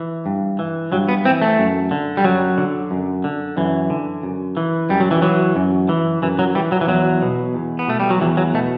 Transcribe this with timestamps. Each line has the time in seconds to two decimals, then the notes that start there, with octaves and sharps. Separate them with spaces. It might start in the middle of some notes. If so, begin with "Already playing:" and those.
Already playing: E3
0.26 G2
0.59 E3
0.92 G2 F#3
1.09 B3
1.25 E3 C4
1.42 A3
1.59 F#2
1.91 D3
2.17 G3
2.24 F#2 F#3
2.58 D3
2.91 F#2
3.24 D3
3.57 F#2 E3
3.90 D3
4.23 F#2
4.57 E3
4.89 F#2 G3
5.00 F#3
5.11 E3
5.22 E3 F#3
5.56 F#2
5.89 E3
6.22 F#2 E3
6.39 F#3
6.55 E3 G3
6.72 F#3
6.81 E3
6.88 E2 F#3
7.22 B2
7.54 E2
7.79 B3
7.88 B2 A3
8.00 G3
8.10 F#3
8.21 E2 E3
8.37 F#3
8.54 B2 A3